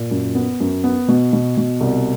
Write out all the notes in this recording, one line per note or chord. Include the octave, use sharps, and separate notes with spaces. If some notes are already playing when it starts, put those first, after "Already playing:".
Already playing: A#2
F#2
B3
F#2
B3
B2
B2
B2
C2